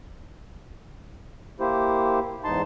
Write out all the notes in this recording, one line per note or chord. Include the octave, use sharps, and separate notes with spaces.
A#3 E4 G4 C5
E2 G#2 D#4 A5 C6